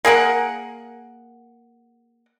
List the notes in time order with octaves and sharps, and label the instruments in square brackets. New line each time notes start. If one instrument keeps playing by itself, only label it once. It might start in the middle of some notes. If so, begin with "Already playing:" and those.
[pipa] A#3 G#4 A#4 F#5